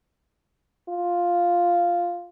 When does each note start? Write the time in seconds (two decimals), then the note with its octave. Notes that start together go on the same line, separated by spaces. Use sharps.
0.89 F4